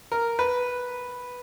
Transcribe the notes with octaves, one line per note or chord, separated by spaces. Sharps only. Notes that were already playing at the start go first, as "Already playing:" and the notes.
A#4
B4